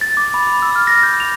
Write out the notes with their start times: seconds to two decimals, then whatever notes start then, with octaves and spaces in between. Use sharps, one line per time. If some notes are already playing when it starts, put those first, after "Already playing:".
0.01 A6
0.17 D6
0.34 B5
0.47 B5
0.62 E6
0.76 F6
0.87 A#6
1.03 G6
1.20 F7